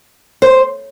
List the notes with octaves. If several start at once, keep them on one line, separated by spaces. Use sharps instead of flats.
C5